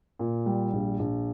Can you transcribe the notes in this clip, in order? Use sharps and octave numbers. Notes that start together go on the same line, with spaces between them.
A#2
G3
A#1
A#1